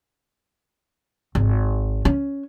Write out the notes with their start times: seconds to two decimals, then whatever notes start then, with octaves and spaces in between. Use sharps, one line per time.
1.35 G#1
2.05 C#4